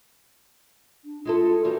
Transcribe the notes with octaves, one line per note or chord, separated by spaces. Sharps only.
D4
G#3 E4 F4 A4
E3 G3 A#3 F#4